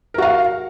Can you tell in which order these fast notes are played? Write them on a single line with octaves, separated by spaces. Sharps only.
A#4 F#4 F5